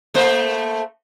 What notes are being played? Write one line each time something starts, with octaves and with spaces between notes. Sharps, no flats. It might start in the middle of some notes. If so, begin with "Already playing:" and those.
A3 A#3 C5